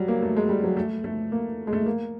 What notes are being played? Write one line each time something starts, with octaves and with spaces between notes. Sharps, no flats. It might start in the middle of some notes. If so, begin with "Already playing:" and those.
Already playing: F#3 G3
A#3
A3
G#3
G3
F#3
A3
A3
A#3
G#3
A3
A#3